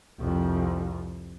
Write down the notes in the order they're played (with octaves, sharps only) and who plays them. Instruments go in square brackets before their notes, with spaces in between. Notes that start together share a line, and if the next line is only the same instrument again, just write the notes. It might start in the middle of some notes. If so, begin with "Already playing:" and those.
[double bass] C2 F2